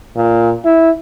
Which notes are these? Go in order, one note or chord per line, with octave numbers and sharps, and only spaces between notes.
A#2
E4